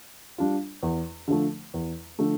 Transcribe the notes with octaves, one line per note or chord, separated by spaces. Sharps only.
G3 D4 F4
E2
D3 F3 A3
E2
D3 F3 A3